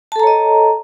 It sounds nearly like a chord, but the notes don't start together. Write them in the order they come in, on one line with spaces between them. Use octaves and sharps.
A5 A4 A#5 C#5 D#5